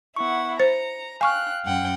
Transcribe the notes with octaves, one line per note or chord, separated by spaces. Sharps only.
B3 E4 F#5 C#6
C5 A#5 C#7
F5 G5 G#5 C#6 F6 F#6
F#2 F#5 G5